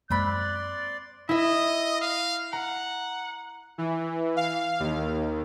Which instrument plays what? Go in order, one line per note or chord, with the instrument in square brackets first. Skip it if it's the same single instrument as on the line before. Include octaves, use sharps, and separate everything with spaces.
[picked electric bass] F#2 G#3 A#3 [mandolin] C4 B5 [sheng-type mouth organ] D5 C6 [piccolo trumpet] F#6
[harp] E4 E5 [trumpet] D#5
[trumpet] F5
[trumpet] F#5 [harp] A#5
[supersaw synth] E3
F5
D#2